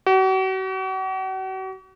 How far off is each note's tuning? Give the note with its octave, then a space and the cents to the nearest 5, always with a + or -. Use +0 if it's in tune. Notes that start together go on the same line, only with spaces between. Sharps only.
F#4 +40